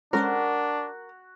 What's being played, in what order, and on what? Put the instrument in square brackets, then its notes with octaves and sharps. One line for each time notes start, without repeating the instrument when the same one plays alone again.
[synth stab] G#3 C#4 C5 [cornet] D4 [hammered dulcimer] F#4 [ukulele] A#4